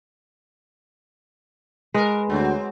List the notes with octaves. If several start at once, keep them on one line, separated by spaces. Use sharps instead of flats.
G#3 A#4 B4
D2 F#3 C4